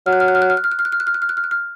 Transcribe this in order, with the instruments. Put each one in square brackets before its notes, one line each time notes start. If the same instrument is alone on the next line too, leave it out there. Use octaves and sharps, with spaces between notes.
[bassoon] F#3 [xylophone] F6
[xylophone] F#6
F6
F#6
F6
F#6
F6
F#6
F6
F#6
F6
F#6
F6
F#6
F6
F#6
F6
F#6
F6
F#6
F6